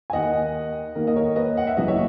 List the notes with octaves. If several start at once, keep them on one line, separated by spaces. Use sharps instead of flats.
G#5
D#2 D#3 A#3 D#5 F#5
D#2 D#3 A#3 A#4
D#5
A#4 C#5
B4 D#5
F#5
E5
F#1 F#2 E3 D#5
C#5 E5